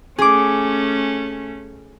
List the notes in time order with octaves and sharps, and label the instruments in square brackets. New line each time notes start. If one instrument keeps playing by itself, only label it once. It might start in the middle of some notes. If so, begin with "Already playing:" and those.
[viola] A3 C#4 [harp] G#4 D6